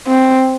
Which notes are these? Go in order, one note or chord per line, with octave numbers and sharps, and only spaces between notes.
C4